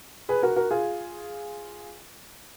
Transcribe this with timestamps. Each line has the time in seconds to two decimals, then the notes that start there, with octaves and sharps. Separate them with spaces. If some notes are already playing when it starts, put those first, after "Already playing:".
0.29 G#4 B4
0.42 F#4 A#4
0.56 F#4 A#4
0.70 F4 G#4